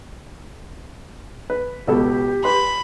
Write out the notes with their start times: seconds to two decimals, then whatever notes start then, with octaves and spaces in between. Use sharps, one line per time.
1.50 B4
1.87 C#2 B2 G4 A4
2.44 B4 B5 C6